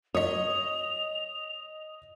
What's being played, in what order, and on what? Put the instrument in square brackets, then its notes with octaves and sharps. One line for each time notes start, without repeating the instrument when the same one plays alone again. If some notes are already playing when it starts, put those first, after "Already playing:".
[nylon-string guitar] C#5 [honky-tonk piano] D#5 D#6 [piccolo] F7